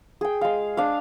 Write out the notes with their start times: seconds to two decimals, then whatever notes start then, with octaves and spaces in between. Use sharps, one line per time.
0.21 G#4 G5
0.41 G#3 F5
0.77 D4 F5